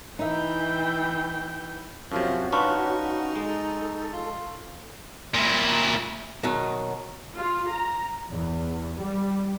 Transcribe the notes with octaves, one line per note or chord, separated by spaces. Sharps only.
E3 D#4 E5 G5
F#2 C3 F3 C#4 F#4
D4 D#4 F4 B4 C#6
G#3 A4
F4
A#2 E4
B2 D#3 F#3 D#4
F4
A#5
E2
G3